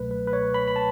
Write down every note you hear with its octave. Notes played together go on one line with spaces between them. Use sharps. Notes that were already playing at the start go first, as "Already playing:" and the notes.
Already playing: C#2 B2 F#3 A3 B4
B4
B4
C#5
B5
B5
A5